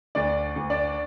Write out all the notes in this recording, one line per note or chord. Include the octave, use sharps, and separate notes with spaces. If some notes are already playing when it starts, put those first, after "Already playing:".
D2 D4 D5
D2
D4 D5